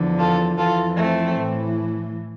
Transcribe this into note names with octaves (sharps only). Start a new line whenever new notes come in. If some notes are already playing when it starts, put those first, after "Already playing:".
Already playing: E2 D3 F3
F4 A4
F2 E3 F4 A4
A3 C4
A2 E3